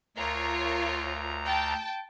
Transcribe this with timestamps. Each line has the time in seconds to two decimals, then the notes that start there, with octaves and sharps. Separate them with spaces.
0.17 D2 F4 A#4 C#5 A#5
1.45 G5 A5